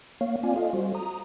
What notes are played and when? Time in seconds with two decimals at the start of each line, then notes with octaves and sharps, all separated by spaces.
0.21 A#3 C#5 F5
0.43 C4 F4 D5 F5 G#5
0.56 F4 A4 D#5 F5
0.73 G3 F#4 C5
0.95 A#5 D#6